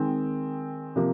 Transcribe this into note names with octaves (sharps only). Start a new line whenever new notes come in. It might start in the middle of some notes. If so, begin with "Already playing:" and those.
Already playing: D#3 G#3 C4
C3 F3 A#3